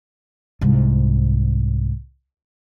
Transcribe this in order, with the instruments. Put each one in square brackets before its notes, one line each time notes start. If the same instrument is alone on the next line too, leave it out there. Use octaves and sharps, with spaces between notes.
[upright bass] C2 G#2